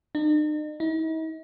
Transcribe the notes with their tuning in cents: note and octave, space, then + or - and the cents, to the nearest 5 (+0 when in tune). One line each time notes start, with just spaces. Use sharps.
D#4 -45
D#4 +45